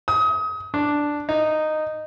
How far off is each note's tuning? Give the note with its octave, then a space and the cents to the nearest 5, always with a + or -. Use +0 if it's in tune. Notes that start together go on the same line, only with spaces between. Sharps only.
D#6 +30
D4 +0
D#4 -10